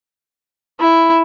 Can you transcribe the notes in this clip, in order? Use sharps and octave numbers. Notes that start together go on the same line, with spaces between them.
E4